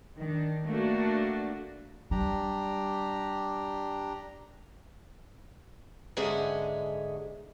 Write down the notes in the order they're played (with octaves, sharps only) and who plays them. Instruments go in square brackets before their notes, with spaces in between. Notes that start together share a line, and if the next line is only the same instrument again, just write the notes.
[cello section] D#3 D4
A3 A#3 D4 F#4
[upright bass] G3 [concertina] D4 G4 A#5
[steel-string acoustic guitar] G#2 D3 G#3 C#4 G#4 E5